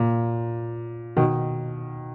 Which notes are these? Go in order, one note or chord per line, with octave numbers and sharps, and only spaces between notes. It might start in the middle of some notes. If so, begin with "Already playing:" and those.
Already playing: A#2
B2 D#3